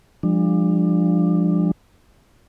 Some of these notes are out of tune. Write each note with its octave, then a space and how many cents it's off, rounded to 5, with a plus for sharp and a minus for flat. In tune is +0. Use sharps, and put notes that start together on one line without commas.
F3 +0 G#3 -45 D4 +20